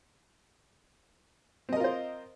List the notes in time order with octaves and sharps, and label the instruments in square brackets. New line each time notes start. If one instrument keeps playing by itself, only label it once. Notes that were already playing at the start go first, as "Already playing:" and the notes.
[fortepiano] C4
D#5
A#4
F4
C5